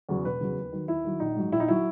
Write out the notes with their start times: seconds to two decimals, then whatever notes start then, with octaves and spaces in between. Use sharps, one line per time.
0.09 E2 C#3 F#3
0.25 E1 B4
0.40 E2 C#3 F#3
0.56 D#2
0.72 D#3 F#3
0.88 D#2 E4
1.04 D#3 F#3
1.20 A#1 D#4
1.36 G#2 F#3
1.52 A#1 E4
1.60 D#4
1.68 F#3 E4